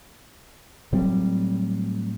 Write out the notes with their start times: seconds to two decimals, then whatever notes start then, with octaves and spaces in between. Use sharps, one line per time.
0.93 A2 F#3 G3 C4